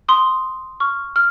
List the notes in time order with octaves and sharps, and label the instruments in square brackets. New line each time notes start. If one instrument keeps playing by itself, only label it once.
[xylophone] C6 D#6
C#6 F6
F6